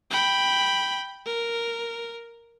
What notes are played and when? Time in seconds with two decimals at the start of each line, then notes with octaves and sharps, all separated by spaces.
0.11 G5 B5
1.26 A#4